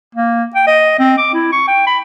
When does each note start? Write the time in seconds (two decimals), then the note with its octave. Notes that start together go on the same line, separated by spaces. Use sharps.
0.15 A#3
0.56 G5
0.67 D#5
0.99 C4
1.18 D6
1.34 E4
1.53 C#6
1.68 G5
1.87 B5